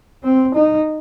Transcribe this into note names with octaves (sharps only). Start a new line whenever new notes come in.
C4
D#4